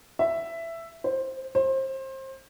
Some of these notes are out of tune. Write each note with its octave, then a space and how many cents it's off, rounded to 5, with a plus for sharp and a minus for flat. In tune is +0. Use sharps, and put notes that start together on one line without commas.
E5 +10
C5 +15
C5 +30